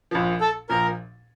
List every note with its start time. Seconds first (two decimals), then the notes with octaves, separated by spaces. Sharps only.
0.11 A#1 A#2 F3
0.41 A4
0.69 A#1 A#2 F3 A#4